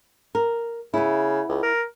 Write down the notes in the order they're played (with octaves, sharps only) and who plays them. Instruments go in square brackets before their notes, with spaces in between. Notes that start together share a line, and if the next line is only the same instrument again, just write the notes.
[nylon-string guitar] A#4
[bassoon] C#3 [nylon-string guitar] B3 E4
[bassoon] C#2
A#4